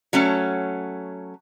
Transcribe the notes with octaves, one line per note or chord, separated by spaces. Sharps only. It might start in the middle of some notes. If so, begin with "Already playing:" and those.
F#3 A3 C#4